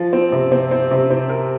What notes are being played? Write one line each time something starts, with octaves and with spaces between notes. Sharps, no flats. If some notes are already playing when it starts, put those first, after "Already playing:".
Already playing: F3
C4
C3
C4
C4
C3
C4
A#4